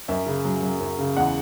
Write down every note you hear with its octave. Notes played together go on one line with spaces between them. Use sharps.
F#2 E5
C#3
F#3
F#3
F#2
C#3
E2 F#5